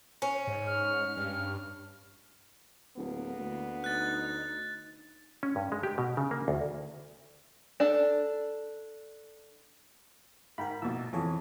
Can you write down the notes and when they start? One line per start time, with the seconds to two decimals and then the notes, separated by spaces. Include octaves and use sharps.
0.22 C#4
0.47 G#2
0.67 F6
1.17 G2
2.97 D1 A#3 B3
3.40 D2
3.84 D#4 F#6 A6
5.43 C#4
5.56 G2
5.72 G#3
5.83 G4
5.98 B2
6.17 C#3
6.31 A#3
6.48 D2
7.80 D4 A4
10.58 G#2 A#4 G5 B5
10.82 A#1 B2 E6
11.13 F2 E3 G#4 C#5